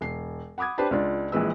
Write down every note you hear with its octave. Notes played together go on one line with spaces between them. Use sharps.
E1 C7
F#5 B5 D6 D#6 G#6
D4 G4 B4 C5 A5
C#2 D4 F4 D5
A#1 A#2 E3 G#3 B4 E6